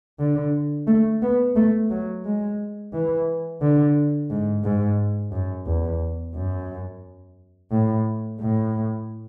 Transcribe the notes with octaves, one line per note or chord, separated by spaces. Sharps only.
D3
A3
B3
A3
F#3
G#3
E3
D3
G#2
G#2
F#2
E2
F#2
A2
A2